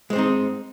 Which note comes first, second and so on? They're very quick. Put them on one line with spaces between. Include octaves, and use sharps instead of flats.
G#3 C5 C4 D#4